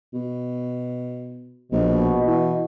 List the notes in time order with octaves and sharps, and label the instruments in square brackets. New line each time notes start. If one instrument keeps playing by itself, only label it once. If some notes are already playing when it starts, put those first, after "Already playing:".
[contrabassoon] B2
[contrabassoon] A#1 [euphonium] B2
[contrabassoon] E3